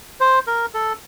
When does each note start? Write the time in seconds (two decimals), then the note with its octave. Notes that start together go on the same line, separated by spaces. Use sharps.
0.20 C5
0.47 A#4
0.74 A4